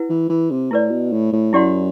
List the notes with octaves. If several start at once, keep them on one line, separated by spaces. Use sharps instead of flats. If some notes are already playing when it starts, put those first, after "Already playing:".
Already playing: E4 B4 F#5
E3
E3
C3
A2 E4 B4 D5
B2
A2
A2
F#2 E4 G4 D5 F#5 C6